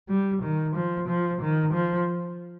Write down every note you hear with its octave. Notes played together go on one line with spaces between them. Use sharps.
G3
D#3
F3
F3
D#3
F3